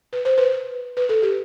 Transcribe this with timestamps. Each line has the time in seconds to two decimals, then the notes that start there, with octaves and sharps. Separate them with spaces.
0.13 B4
0.25 C5
0.38 B4
0.97 B4
1.09 A4
1.22 G4